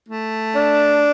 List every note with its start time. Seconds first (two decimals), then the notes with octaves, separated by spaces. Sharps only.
0.09 A3
0.55 D4